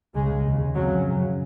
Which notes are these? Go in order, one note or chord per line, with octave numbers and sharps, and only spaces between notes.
C#2 C#3 G#3
D#2 C#3
F2 C#3 F#3
F#2 C#3